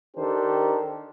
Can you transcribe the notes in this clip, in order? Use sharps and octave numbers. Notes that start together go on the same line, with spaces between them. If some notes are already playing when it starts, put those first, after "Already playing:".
D#3 D4 G4 A4 A#4 C5